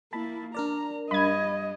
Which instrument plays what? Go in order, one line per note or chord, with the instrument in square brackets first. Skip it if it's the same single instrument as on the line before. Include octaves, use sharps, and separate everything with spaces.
[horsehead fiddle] A#3 E4 [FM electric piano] A5 B5 A6
[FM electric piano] D4 A#4 D5 [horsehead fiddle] A#5
[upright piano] G2 [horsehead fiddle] D#5 [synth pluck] B5 G#6